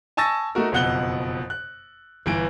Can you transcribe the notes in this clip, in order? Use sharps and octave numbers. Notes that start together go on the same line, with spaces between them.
G#5 A5 C#6 E6 A6 A#6
A3 D#4 F#4 A#4
F#1 F2 B2 F#5 F#6 G7
F#6
G1 E3 D7